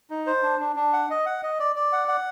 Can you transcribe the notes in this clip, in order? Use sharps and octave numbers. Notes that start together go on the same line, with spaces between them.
D#4
C5
D4
D4
D4
F#5
D#5
F#5
D#5
D5
D5
F#5
F#5